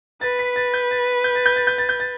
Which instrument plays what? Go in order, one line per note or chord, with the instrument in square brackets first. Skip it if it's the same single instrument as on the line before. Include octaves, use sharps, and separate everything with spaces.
[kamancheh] B4 [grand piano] A6
[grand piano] B6
A6
G6
A6
G6
A6
G6
A6
G6
A6
G6
A6